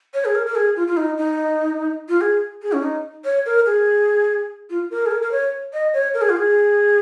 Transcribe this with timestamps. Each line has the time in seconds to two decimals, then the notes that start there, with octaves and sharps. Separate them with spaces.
0.14 C#5
0.25 G#4
0.35 A#4
0.46 A#4
0.55 G#4
0.76 F4
0.87 F4
0.96 D#4
1.17 D#4
2.09 F4
2.21 G#4
2.62 G#4
2.72 C#4
2.83 D#4
3.24 C#5
3.46 A#4
3.66 G#4
4.70 F4
4.90 A#4
5.06 G#4
5.11 A#4
5.22 A#4
5.31 C#5
5.73 D#5
5.93 C#5
6.14 A#4
6.21 G#4
6.29 F4
6.37 G#4